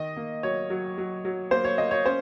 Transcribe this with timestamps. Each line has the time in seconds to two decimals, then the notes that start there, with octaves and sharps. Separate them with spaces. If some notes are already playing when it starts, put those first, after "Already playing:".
Already playing: D#3 D#5
0.17 A#3
0.43 F#3 C#5
0.70 F#3
0.98 F#3
1.25 F#3
1.51 A#3 C5
1.64 C#5
1.78 A#3 D#5
1.91 C#5
2.05 C#4 C5